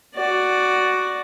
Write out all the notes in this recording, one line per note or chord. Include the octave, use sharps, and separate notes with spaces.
F#4 D5